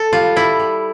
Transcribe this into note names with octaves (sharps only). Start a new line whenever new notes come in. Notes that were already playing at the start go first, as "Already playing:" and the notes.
Already playing: A4
G3 F4
G3 E4
G3